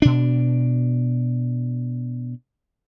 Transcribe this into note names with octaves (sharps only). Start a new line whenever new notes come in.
B2 D4